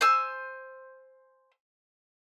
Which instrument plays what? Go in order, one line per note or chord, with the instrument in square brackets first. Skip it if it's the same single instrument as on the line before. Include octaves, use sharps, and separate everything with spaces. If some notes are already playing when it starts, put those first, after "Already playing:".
[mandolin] C5 G#5 E6